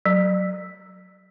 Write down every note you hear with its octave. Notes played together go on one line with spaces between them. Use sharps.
F#3